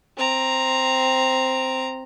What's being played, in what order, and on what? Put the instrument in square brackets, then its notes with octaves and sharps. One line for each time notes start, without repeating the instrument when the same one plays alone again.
[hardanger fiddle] C4 A#5